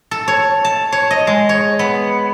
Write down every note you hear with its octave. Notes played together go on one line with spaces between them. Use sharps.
A4
C#5
A5
C#5
D#5
G#3
C#5
B3